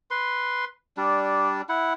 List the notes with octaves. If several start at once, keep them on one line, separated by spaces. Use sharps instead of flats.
B4 C6
G3 D4
E4 F#5